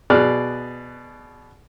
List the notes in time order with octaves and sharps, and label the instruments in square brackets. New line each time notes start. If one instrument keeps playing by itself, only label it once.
[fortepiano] B2 G#4 D5 F6 F#6